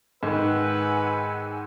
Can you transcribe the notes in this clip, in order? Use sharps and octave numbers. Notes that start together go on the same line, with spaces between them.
G#2 D#3 B4 F#5 G#5 E6